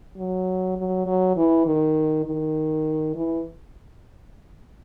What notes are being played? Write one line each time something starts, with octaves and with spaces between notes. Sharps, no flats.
F#3
F#3
F#3
E3
D#3
D#3
E3